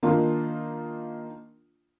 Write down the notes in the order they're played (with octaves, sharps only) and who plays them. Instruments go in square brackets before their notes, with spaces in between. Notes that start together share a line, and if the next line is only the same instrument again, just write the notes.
[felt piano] D#3 A#3 D4 D#4 F4